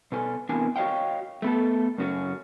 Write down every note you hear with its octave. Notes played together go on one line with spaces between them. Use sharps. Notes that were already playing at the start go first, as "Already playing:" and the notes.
B2 A4 G#5
C3 E3 B3 D4 A#4 G#5
F#4 C#5 D#5 F5 G5
A3 B3 A4
F#2 C#3 C#4 F#4